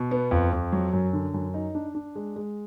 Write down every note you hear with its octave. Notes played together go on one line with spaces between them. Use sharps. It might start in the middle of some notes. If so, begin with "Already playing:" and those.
Already playing: B2
B3
F2
F2
F#3
F#2
D3
F#2
D#4
D4
D4
G#3
G#3